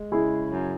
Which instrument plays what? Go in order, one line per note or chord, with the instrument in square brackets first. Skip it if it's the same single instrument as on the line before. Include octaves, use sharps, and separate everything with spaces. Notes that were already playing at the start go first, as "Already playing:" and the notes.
Already playing: [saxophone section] G#3
[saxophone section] C#3 [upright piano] E4 G#4
[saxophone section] F#2